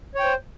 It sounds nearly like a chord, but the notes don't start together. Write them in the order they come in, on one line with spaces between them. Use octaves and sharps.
C#5 G5 C5